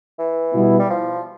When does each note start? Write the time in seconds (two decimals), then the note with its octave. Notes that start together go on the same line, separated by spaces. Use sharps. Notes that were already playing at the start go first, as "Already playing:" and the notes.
0.19 E3
0.54 B2 G3 B3 E4
0.79 G3
0.90 F3